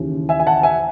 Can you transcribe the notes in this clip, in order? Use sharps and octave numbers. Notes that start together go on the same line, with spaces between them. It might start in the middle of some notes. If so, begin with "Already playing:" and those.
Already playing: D#2 C#3 E3
E5 G#5
G#5
F#5 A5
E5 G#5